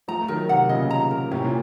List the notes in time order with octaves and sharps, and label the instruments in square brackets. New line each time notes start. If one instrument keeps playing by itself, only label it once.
[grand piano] F3 A3 [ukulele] A#5
[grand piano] A3
[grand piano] D#3 F#3 [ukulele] A#4
[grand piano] C3 D#3 [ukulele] F#5
[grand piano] A#2 C#3 [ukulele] D#5
[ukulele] A#5
A#4
[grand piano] A2 C3 [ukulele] C#4
[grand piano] A#2